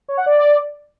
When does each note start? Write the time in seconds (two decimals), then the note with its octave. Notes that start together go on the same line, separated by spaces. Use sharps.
0.08 C#5
0.17 F#5
0.26 D5